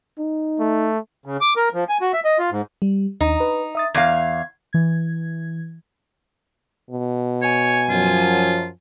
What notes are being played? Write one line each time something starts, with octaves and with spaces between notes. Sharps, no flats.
D#4
A3
C#3
D6
A#4
F3
G#5
F#4
E5
D#5
F4
G#2
G3
D#2 D#4
B4
E5 D#6 A6
E2 F5 G#6
E3 G#6
B2
C#5 G#5
F#2 F3 F#3 F4